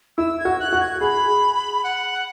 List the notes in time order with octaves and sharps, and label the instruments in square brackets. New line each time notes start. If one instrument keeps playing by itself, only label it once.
[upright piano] E4 [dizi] E6
[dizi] G#6
[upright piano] F#4
[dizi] F#6
[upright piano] F#4
[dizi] G#6
[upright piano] G#4 [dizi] B5
[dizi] F#5